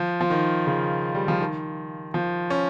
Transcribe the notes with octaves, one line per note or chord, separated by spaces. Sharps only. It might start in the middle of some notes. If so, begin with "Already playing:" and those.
Already playing: F3
F3
D#3
C#3
G3
F3
D#3
F3
C#4